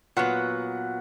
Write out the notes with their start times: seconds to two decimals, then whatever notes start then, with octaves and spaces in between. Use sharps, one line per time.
0.17 A#2 F#3 B3 F#5